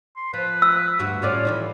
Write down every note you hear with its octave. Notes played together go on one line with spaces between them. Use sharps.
C6
F3 B4
E6
D2 G2 F#4
A2 C#4 F4 D5
D#3 E3 G3